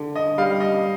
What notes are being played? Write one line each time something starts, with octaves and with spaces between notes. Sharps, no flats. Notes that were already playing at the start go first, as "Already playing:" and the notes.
Already playing: D3
D#5
G3 F5
D#5